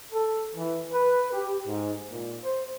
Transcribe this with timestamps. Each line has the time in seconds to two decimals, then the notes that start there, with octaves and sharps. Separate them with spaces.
0.12 A4
0.55 E3
0.92 B4
1.32 G4
1.67 G#2
2.10 A#2
2.44 C5